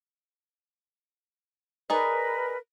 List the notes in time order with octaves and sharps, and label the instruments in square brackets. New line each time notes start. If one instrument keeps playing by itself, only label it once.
[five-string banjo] D#4 G#4 D5 [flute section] A#4 B4